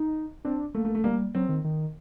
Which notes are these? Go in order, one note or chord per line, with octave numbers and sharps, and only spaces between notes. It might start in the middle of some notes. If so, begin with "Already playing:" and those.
Already playing: D#4
C4 D4
A3 A#3
A3
A3
G3 A#3
F#3 C4
D#3
D#3